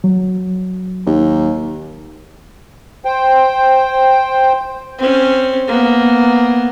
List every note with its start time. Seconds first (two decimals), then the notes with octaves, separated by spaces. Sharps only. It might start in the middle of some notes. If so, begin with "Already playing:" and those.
0.04 F#3
1.06 D#2
3.05 C5 G5
4.99 C4 C#4
5.67 A#3 B3